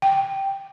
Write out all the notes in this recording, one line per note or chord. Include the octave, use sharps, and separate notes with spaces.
G5